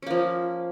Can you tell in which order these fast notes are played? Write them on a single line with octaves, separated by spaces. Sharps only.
C#4 A#3 F3